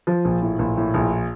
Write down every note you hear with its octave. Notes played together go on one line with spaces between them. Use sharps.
F3
A#1
A2
A#1
A2
A#1